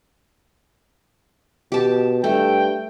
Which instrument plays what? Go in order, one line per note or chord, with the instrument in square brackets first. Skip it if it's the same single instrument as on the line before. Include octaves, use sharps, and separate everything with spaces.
[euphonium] B2 [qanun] G4 A5
[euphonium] G2 [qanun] A3 [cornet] G5